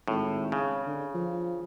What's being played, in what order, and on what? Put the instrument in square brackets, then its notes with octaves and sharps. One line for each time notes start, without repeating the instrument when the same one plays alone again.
[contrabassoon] G#1 [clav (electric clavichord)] A2
[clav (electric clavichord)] C#3
[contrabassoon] D3
F3